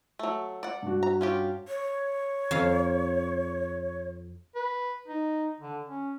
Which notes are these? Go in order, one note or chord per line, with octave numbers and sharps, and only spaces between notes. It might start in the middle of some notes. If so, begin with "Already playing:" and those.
F#3 A3
D5 F#5
G2 F#4
A#5
C#4 F4 G4
C#5
F2 F5
B4
D#4
D3
C#4